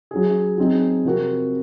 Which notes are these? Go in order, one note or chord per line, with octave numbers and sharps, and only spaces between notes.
F#3 C#4 G#4
F#3 C4 D#4 G#4
C3 F3 C4 F#4 A#4